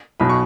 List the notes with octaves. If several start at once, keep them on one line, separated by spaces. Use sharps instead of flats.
B1 B2 B5
C#6